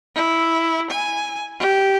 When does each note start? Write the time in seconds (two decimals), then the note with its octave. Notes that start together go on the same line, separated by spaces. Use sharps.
0.15 E4
0.91 G#5
1.59 G4